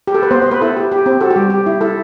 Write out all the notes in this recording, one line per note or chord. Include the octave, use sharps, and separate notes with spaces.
G4
A4
B4
B3 C5
C5
B3 B4
E4 A4
G4
G4
C4
F#4 A4
G4
G3
G4
E4
E4 A4